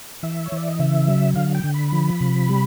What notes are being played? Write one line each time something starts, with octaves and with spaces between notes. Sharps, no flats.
E3 E5
C#5
E3
D5
D#5
C#3 E5
F#3
D3 F5
G5
D3
B5
F3
C3
G3